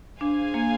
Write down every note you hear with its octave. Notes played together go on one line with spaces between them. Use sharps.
D4 G#4 C5 F5 G#5
A#3